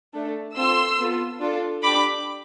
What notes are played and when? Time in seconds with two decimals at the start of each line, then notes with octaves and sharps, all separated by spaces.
0.14 A3 D4 A4
0.56 C4 F4 A4 C6 E6
0.98 B3 F4 A4
1.41 D4 F4 A4
1.83 D4 G4 B5 D6